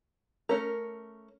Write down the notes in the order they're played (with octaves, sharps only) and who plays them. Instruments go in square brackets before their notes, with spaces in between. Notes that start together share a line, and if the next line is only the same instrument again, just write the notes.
[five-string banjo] A3 C#4 A#4